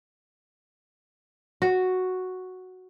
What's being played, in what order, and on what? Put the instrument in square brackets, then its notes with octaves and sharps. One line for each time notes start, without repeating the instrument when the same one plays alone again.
[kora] F#4